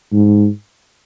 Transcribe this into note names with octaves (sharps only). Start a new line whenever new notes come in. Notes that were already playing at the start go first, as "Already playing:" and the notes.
G#2